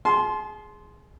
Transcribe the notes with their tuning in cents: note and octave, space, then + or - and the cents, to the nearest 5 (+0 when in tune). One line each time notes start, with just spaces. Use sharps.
G#4 +0 A5 -40 C6 +0